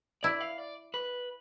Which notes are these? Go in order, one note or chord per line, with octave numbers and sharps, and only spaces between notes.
E4 D5
F5
D5
B4